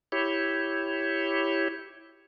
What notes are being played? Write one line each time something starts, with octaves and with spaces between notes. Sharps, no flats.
E4 G4 C#5